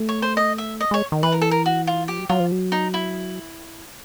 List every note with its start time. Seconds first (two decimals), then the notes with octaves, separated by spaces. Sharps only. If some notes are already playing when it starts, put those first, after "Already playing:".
Already playing: A3
0.09 C#5
0.22 C5
0.37 D#5
0.58 E5
0.81 D#5
0.91 G#3 C#5
1.12 D#3
1.23 E3 B4
1.32 A#4
1.41 A4
1.51 A#4
1.66 F#4
1.87 F4
2.08 F3 G4
2.19 F#3
2.29 F#3 F4
2.40 F3
2.52 F#3
2.72 D#4
2.94 E4